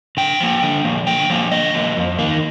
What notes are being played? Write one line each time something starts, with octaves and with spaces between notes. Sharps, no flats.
D3 G5
F3 A#3
D3
F3 A#3
D3 G5
F3 A#3
D3 D#5
F3 A#3
F2
D#3 A#3